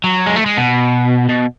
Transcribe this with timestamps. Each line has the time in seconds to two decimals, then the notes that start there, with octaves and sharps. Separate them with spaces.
0.04 F#3
0.26 G#3
0.36 A3
0.46 G#3
0.57 B2
1.29 B2